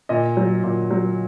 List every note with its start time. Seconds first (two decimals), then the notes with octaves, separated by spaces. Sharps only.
0.09 A#2 D#5
0.37 F#3
0.64 A#2
0.91 F#3